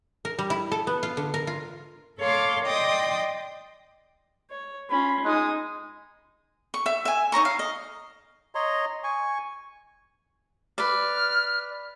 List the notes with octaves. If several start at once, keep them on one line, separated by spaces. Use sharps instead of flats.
A#4
G3
E4
A4
B3
F4
D3
A#4
F4
A4 C#5 F5 C6 D6
D5 D#5 G5 C6 D6 D#6
C#5
C#4 F4 B5
G#3 D#4 D#6
C#6
E5
E5 G#5
D#4 C#5 A#5 C#6
F5
D#5
C#5 D#5 A#5 C6
G#5 C#6
B4 D5 F6